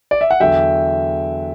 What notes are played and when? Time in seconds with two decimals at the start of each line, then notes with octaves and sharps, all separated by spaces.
0.11 D5
0.21 E5
0.31 F#5
0.40 E2 D3 F#3 E5 G5